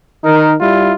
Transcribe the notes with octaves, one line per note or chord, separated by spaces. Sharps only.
D#3 D#4 A#4
G3 E4 F4